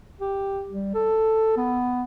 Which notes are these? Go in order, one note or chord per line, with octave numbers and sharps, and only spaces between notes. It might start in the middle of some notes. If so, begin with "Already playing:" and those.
G4
G3
A4
B3